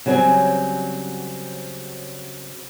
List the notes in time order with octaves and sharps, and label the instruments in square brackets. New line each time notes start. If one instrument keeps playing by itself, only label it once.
[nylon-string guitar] C#3 F#3 G3 C4 G#4 G#5